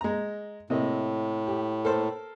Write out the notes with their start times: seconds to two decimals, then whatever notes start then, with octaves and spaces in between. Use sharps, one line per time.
0.01 G#3 A#5
0.70 A2 C3 A#3 D#5
1.47 G4
1.85 A4 A#4 C5